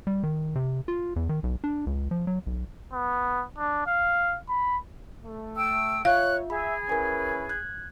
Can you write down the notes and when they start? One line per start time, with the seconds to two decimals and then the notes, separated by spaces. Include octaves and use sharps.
0.07 G3
0.23 D#3
0.55 C3
0.88 F4
1.16 E2
1.29 D#3
1.43 B1
1.64 D4
1.87 C#2
2.11 F3
2.27 F#3
2.46 B1
2.93 B3
3.58 D4
3.87 F5
4.49 B5
5.24 A3
5.56 G5 E6
6.05 F4 C#5 E5 F5 F#6
6.50 G#4 E5 G#5 B5
6.89 C#4 E4 A#4 B4 G#5
7.49 F#6 G#6